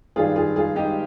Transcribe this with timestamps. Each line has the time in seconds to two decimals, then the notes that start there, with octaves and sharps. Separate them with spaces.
0.16 G2 D#3 G3 F4 G#4
0.36 F4 G#4
0.56 F4 G#4
0.76 D#4 G4